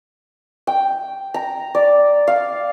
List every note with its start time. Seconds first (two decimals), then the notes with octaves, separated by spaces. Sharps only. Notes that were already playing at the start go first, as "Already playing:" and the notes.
0.67 G5
1.34 A#5
1.75 D5
2.28 F5